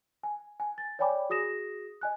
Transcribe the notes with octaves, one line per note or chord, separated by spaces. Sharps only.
G#5
G#5
A6
C#5 D5 G5 G#5 B5 D6
F#4 G#4 D#6 A#6 E7
D#5 G#5 F#6